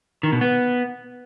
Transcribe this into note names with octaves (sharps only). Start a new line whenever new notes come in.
D#3
B2
B3